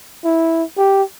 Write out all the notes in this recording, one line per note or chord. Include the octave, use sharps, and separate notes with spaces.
E4
G4